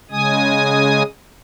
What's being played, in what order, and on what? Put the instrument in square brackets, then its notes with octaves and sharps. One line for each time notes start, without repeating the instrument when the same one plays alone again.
[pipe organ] C#3 G#3 G#5 D#6